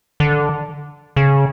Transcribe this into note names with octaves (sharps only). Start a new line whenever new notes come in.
D3
C#3